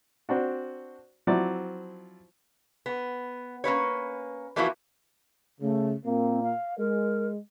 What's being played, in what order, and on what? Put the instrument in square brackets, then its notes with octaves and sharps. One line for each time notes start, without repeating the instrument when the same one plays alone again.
[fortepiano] C4 D4 F#4
F3 F#3 C4 E4 D5
[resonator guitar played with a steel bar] B3
A#3 C#4 B4 C#5
E3 F3 A#3 B3 E4 F#4
[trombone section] C#3 [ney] A3
[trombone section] A#2 A#3 [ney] C4
[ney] F5
[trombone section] G#3 [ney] A#4